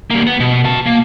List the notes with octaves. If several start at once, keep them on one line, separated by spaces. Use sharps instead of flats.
G3 A#3
B3
B2
F#4 A5
A#3